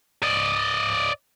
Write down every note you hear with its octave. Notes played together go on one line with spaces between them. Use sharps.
D5 D#5